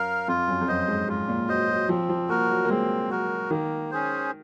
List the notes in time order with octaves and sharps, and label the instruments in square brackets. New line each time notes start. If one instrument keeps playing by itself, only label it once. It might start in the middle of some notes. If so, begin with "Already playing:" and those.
Already playing: [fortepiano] F#2 [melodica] A#4 F5
[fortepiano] F2 [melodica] F4
[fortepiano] F#2
F2
[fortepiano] F#2 [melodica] C5 D#5
[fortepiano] G#2
[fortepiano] G#2 [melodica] F4
[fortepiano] A#2
[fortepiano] F#3 [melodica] C5 D#5
[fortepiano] F#3
[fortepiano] F3 [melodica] C4
[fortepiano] F3
[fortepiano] A#3 [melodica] F#4 A#4
[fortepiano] F#3
A#3
[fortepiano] G#3 [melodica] C4
[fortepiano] F#3 [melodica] F#4 A#4
[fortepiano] D#3 [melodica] A#3
[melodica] C#4 G#4 C5